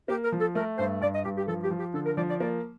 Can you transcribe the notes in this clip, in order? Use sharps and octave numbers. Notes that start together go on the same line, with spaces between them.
A#3 G4
A#4
F3
A4
A3 A#4
G2 C5
G2 D5
D#5
G2 G4
G4
F3 A4
G4
F3
G4
D3 A4
A#4
F3 D5
D5
A#3 D5